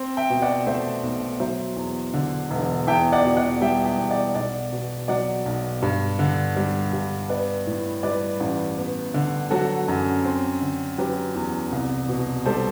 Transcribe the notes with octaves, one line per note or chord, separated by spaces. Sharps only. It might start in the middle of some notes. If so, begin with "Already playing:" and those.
Already playing: C4
E5 G5
B2
D5 F#5
A3 C5 E5
B1
F#3 C5 E5
E2
D3
E1
E2 E5 G5
D5 F#5
B2
D5 F#5
G3 E5 G5
E5 G5
E2
D5 F#5
B1 D5 F#5
B2
F#3 D5 F#5
B1
G2
D3
G3
G2
B3 B4 D5
A2
G3 B4 D5
A1
B3
D3
F#3 F#4 A4
F#2
C4
D3
F#3 G4 B4
E2
C2
B2
G3 A4 C5